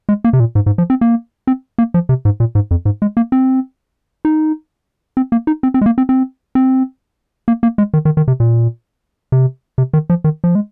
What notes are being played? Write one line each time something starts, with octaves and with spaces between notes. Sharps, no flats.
G#3
A#3
C3
A#2
G#2
G#2
F3
C4
A#3
C4
A#3
F3
C3
G#2
A#2
G#2
F2
G#2
G#3
A#3
C4
D#4
C4
A#3
D#4
C4
C4
G#3
A#3
C4
C4
C4
A#3
A#3
G#3
D#3
D#3
D#3
C3
A#2
C3
C3
D#3
F3
D#3
F3
G#3